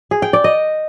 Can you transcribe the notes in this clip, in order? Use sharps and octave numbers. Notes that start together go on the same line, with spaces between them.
G#4
G5
D5
D#5